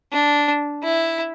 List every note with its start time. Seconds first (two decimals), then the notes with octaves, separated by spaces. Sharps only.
0.13 D4
0.83 E4